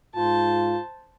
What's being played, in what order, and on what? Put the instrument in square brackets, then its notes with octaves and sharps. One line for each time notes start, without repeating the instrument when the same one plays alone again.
[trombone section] G#2 F4 [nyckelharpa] C5 A5